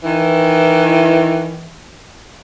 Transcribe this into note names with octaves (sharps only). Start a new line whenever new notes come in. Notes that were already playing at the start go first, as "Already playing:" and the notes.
D#3 E3